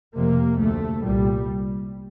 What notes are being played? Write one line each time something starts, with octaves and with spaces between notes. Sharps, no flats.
F1 F2 C3 A#3
D2 C3 A3
C2 A#2 G3